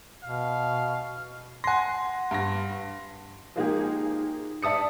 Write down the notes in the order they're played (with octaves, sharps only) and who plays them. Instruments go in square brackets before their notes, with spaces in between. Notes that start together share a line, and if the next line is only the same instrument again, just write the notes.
[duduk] B2 [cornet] F5
[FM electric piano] F#5 C6 [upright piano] G#5 A#6
[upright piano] G2 A#6
[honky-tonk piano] F3 G#3 A#3 D#4 G4 G#4
D5 E5 A5 D#6 C#7